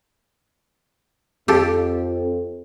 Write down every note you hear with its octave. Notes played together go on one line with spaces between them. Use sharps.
F2 G4 A4